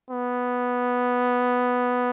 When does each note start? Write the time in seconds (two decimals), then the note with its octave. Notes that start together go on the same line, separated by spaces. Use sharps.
0.11 B3